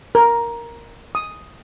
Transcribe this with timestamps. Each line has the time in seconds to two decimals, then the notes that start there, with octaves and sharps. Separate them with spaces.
0.15 A#4
1.15 D#6